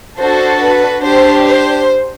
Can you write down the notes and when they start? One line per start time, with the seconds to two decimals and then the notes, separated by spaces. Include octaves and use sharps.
0.19 D4 F#4 A4 C5
0.61 B4
1.04 D4 G4 C5
1.47 C5